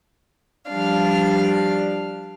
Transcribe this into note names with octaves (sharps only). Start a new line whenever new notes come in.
F3 G3 D4 F5